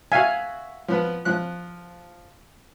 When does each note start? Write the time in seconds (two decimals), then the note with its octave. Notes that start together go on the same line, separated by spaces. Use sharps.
0.12 F#4 E5 F5 G#5
0.88 F3 B3 B4
1.25 F3 F#6